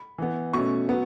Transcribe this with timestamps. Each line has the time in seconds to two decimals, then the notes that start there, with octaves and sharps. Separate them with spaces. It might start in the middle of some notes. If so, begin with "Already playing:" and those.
Already playing: B5
0.18 E3 B3
0.53 B2 A3 C#4 C#6
0.89 F#3 B3